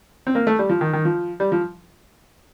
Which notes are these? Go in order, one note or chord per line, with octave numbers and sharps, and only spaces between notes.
C4
A#3
A3
G3
F3
D#3
D#3
F3
G3
F3